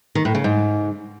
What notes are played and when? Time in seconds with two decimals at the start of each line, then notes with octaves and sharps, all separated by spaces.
0.15 D#3
0.25 A2
0.35 C#3
0.44 G#2